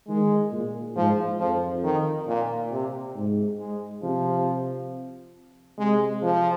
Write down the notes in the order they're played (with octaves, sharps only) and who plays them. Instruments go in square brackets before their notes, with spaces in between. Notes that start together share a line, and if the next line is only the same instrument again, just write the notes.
[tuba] D#3 [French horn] G#3
[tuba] A#2
[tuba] G#2 [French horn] F3
[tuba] F2 [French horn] F3
[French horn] D#3
A#2
C3
[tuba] G#2
[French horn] G#3
[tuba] C3 [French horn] F3
[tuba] C3 [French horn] G#3
[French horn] F3